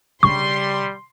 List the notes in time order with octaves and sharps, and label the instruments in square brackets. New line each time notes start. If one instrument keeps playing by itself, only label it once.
[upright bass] C#3 D4 [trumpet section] G3 [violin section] C6 [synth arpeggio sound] C#6